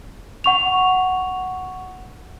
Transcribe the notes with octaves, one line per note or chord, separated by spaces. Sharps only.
F#5 C#6 F7